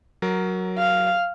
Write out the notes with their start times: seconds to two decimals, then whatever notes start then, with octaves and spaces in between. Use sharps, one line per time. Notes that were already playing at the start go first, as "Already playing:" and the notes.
0.22 F#3 A#4
0.78 F5